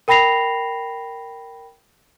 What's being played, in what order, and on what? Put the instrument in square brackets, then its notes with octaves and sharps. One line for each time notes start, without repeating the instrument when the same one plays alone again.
[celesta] A#4 G5 B5 A#6 C7 F7